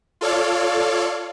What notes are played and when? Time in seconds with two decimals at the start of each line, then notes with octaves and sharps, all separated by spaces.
0.21 F4 A4 C#5 D5 F5